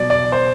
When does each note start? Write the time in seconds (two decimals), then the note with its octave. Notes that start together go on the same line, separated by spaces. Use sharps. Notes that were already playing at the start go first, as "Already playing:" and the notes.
Already playing: B2 F#3 D5
0.10 D5
0.32 C5